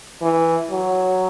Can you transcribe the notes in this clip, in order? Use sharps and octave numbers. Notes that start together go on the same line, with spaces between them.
E3
F#3